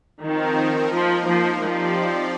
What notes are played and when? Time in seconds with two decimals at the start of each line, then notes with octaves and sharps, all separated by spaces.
0.22 D#3 F3 C4 D#4 A#4
0.91 F3 A#3 D#4 A#4
1.25 F3
1.59 F3 C4 D#4 G4 D5